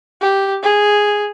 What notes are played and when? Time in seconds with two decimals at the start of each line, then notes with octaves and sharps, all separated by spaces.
0.21 G4
0.63 G#4